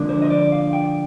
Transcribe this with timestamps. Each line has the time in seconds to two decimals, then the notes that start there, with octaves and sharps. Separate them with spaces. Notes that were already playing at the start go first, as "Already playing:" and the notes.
Already playing: D3 F3 A#3 D4
0.09 C5
0.22 D#5
0.30 D5
0.52 F5
0.73 G5